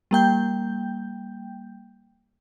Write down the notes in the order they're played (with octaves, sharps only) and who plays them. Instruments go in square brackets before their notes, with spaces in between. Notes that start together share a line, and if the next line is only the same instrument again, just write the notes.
[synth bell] G3 A#3 G5 G6